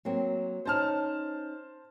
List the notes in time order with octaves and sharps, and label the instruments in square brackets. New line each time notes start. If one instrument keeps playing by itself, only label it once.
[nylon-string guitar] F#3 A#3 C4
[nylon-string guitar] C#4 D#4 [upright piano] C5 A5 F6